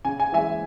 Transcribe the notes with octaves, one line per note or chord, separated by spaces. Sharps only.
C#3 G#5
G#5
E3 G#3 E5 G#5